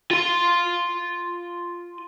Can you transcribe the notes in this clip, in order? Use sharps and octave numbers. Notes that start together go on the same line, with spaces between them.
F4 C6